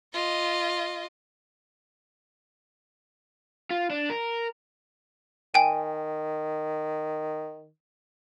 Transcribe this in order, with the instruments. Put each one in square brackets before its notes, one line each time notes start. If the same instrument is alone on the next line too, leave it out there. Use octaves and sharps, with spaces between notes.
[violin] F4 D#5
[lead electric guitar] F4
D4
A#4
[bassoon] D#3 [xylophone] G5 G#5 D#7